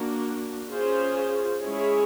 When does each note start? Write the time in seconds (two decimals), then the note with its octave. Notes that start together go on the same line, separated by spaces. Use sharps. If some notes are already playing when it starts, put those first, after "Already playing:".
Already playing: A#3 D4 F#4
0.71 C#4 F4 G#4 C5
1.62 G#3 C#4 E4 G#4 C#5